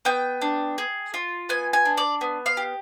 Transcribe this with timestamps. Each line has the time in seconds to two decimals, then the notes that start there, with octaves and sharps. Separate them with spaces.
0.05 B3 G5
0.42 D4
0.78 G#4
1.14 F4
1.49 B3 G#5
1.73 G#5
1.85 D4
1.97 D5
2.21 B3
2.46 F5
2.57 G4